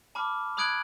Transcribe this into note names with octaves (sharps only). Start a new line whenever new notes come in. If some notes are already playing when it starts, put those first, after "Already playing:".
A5 B5 D6 F6
B5 D#6 F#6 G#6 D7 F#7